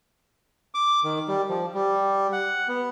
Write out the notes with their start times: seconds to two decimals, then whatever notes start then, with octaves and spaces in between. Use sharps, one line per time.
0.74 D6
1.04 D#3
1.28 G3
1.49 F3
1.75 G3
2.32 F#5
2.68 B3